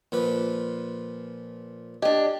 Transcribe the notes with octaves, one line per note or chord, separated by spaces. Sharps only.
A#2 F3 B4
D4 G4 D#5